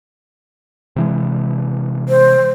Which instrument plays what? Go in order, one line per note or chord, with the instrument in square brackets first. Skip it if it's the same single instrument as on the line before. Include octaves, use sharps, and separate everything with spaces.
[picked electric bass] C3 E3 G#3
[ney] C5